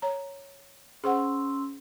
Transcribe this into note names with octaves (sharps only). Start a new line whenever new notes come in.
C#5 A#5
C#4 G#4 C5 F#5 C6 E6